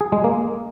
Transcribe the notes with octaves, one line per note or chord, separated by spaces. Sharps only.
G#4
G#3
A#3